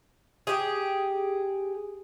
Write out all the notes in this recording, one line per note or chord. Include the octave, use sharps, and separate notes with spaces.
G4 G#4